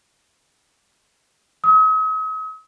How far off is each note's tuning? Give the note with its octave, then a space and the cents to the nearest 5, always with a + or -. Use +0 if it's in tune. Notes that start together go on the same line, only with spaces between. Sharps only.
D#6 +45